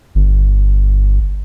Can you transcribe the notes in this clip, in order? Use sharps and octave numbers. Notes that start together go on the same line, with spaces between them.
G1